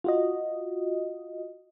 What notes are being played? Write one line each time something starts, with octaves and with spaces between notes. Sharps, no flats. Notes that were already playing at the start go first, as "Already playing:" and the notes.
F4 F#4 D#5